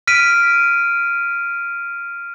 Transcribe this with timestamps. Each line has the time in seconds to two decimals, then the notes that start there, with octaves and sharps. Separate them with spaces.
0.07 F6 B6 D7 D#7